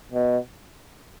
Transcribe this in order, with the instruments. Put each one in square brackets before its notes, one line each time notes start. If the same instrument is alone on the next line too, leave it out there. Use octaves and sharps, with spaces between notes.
[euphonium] B2